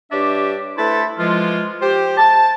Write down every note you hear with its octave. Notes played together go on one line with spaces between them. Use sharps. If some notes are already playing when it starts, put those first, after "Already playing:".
G2 D4 G4 C#5 D5 E5
A3 E4 A4 B4 C5 A5
E3 F3 G#3 F4
G4 C5
A5